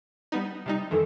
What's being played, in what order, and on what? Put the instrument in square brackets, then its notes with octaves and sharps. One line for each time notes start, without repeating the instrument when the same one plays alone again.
[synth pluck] G3 B3 D#4
C3 G3 D#4
[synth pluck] F2 D#3 E3 [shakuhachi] A4